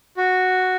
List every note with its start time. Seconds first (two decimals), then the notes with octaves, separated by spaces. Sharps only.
0.17 F#4